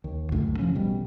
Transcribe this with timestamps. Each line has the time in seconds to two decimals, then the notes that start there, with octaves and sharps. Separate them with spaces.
0.04 D#2
0.32 C#2 F#2 A2 D3
0.59 F#1 F3 C#4
0.75 A1 B2 G3